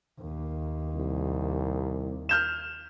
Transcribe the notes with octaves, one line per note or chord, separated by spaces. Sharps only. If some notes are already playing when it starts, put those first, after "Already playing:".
D#2
C2
F6 G6 E7